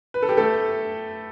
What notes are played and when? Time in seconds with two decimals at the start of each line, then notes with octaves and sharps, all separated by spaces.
0.14 B4
0.22 A4
0.29 G4
0.37 A3 A4